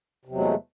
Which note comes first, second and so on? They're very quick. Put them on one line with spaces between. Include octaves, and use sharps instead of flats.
C3 E2 F#3 G#3 A3